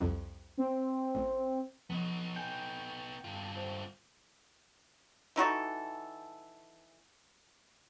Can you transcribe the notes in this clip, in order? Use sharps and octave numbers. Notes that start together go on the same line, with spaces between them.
C2 F2
C4
A1
F3 B3 D#4
G5 G#5
G2 F4
C5
E3 D#4 F#4 A4